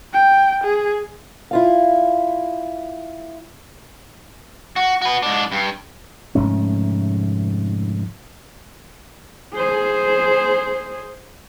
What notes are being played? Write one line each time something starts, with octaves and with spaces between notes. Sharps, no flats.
G5
G#4
E4 F4 F5
F#4
F#4 B4
G#2 D4
G2
F1 G#2 A3 C#4
G#4 C5